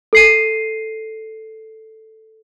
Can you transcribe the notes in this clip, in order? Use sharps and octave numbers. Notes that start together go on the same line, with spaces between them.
A4 C7 D#7